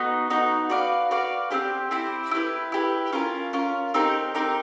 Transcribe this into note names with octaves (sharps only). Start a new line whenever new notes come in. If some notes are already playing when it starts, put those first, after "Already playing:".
Already playing: B3 D#4 F#4
B3 D#4 F#4
F#4 B4 D5 F5
F#4 B4 D5 F5
C4 E4 G4 C5
C4 E4 G4 C5
E4 G4 B4
E4 G4 B4
C#4 F4 A#4
C#4 F4 A#4
C4 D#4 G4 A#4
C4 D#4 G4 A#4